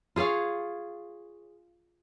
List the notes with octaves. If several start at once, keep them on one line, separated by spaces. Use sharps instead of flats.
F4 G#4 C#5 F5